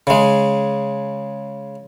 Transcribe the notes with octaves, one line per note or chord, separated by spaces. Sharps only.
C#3 G#3